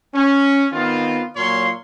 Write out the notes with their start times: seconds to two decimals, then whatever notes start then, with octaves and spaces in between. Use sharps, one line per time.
0.14 C#4
0.73 D#3 B3 C4 F4
1.36 A#2 F#3 C#5 F5 C6